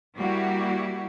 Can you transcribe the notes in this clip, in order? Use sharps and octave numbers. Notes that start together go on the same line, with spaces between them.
G3 A#3 E4 F#4 G4